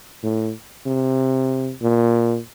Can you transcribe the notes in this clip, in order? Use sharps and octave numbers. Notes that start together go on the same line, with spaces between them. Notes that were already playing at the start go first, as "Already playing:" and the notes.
A2
C3
A#2